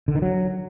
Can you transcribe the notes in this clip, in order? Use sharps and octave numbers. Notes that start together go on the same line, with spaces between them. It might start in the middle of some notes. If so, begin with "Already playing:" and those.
D3
D#3
F#3